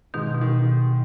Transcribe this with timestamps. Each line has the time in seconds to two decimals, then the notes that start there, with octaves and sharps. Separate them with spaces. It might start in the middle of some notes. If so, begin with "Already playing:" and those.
0.14 G#2 B2 D#3
0.35 B2
0.41 D#3